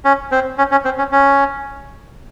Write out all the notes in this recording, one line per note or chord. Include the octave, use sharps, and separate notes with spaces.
C#4
C4
C#4
C#4
C4
C#4
C#4